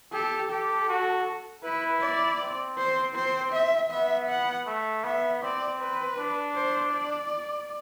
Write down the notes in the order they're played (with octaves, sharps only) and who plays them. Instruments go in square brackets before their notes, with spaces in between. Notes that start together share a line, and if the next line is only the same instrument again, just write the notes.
[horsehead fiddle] G4 [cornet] A4
[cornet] G4 [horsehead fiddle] A4
[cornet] F#4
[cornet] E4 [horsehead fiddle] B4
[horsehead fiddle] D5
[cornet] C4
[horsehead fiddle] C5
C5
E5
[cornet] B3 [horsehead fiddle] E5
[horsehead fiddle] F#5
[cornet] A3
[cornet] B3 [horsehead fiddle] E5
[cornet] C4 [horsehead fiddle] D5
[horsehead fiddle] B4
[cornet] D4
[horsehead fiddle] C5
D5